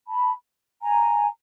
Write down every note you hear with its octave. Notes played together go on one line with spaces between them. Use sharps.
A5 B5
G#5 A#5